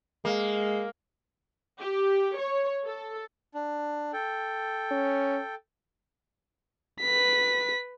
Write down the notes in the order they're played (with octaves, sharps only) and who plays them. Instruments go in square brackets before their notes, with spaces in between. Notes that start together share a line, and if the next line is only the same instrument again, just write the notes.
[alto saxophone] G#3 [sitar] A#3
[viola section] G4
C#5
A4
[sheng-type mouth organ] D4
A4 G5
[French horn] C#4
[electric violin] B4 B6